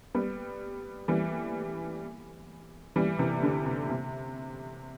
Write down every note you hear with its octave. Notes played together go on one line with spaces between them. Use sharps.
G3 B3
E3 G3
E3 G3
C3 E3
D3
C3
C3